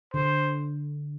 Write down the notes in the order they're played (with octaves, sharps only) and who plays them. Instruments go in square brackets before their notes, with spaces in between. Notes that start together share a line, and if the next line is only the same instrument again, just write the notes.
[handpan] D3 [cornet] C5